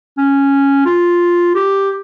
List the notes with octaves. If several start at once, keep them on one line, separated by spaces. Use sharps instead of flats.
C#4
F4
G4